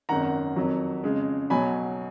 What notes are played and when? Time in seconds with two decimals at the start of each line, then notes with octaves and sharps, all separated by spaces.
0.09 G#1 F#2 D#3 F#5 A#5
0.56 F2 D#3 F#3
1.04 F2 C#3 G#3
1.50 B1 B2 F#3 G#5 B5